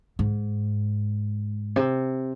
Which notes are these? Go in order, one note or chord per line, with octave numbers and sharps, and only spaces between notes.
G#2
C3